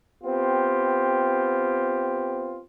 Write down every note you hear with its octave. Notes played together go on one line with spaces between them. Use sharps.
B3 C4 F4 G4